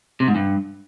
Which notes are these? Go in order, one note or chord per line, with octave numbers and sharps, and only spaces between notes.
C3
G#2
G2